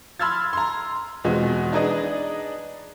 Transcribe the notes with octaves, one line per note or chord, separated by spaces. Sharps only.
B5 C6 E6 F6 G#6 A6
A#5 C6
E2 B2 F3 G#3 C4
D4 D#4 G#4 B4 D5 D#5